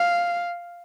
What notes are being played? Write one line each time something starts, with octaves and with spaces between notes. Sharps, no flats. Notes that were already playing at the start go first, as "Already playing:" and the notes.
Already playing: F5